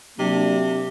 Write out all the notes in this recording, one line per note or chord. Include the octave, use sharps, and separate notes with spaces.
C3 F#3 A#3 D4